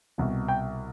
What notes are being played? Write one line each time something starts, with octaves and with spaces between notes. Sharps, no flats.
C2 B2
G5